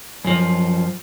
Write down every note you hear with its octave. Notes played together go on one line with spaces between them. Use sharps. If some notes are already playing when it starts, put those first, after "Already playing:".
F#2 F3